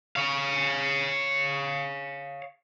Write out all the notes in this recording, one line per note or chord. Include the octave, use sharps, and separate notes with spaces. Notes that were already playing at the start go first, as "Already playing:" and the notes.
C#5 F5